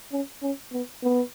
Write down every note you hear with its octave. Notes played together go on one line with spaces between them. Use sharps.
C#4
C#4
B3
B3